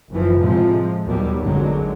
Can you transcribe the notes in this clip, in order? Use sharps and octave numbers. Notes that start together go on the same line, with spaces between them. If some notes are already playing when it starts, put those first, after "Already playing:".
F#1 E3 F3
A2 C3 F3 G#3
D#2 G#2 B2 F#3 G3
G#1 D3 F#3 G#3